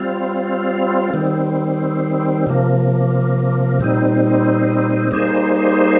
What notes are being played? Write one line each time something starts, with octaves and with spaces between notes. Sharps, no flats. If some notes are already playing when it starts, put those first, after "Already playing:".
Already playing: G3 C4 F4
D#3 G3 C4
C3 F3 A#3
A#2 G3 C4 D#4
G3 A#3 D#4 G#4 C5